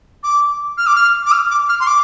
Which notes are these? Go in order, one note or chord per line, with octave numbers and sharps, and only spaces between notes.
D6
F6
D6
F6
D6
F6
D6
F6
C6
D6